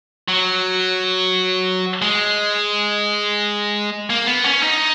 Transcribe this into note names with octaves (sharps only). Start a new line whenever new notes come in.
F#3
G#3
A#3
B3
C#4
D#4